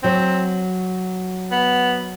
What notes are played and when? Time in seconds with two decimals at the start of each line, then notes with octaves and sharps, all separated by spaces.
0.03 F#3 C4
1.51 B3